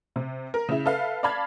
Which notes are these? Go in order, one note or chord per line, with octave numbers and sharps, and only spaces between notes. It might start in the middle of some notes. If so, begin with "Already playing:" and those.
C3
A#4
C#3 E4
A4 B4 E5 F5
D5 F5 A5 B5 F6 G#6